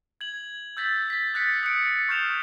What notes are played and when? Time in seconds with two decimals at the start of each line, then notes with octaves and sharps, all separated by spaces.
0.21 G#6 F#7
0.77 E6 G6 A6 B6 F#7
1.10 A6 B6
1.34 D#6 F#6 A6 B6 C#7
1.63 D#6 F#6 C#7 D7
2.09 C#6 F6 G6 C7 E7 F7